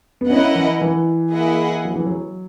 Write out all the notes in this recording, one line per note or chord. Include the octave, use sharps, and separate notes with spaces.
B3
C#4 E4 A#4 D#5 F#5
E3
E3
A#3 E4 G#4 D#5 F#5
F#3
E3
F#3